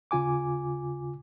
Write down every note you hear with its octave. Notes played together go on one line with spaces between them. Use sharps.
D#2 C#3 F4 G#5 D6